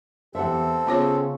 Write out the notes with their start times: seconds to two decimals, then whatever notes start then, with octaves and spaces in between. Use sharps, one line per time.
0.35 E2 C4 G4 A4 E5 F#5
0.87 C#3 B3 F4 C#5